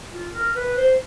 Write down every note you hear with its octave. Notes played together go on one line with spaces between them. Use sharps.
F4
A#4
B4
C5